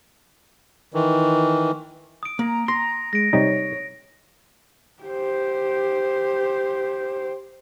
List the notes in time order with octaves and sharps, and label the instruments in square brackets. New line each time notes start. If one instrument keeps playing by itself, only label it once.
[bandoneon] D#3 E3
[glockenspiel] D#6 D7
[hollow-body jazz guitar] A#3 [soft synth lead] A#5
[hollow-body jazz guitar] C6 [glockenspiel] A#6
[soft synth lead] G#3 [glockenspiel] A#6 D7
[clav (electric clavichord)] C3 G3 D#4 [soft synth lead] C#5
[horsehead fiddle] G4 C5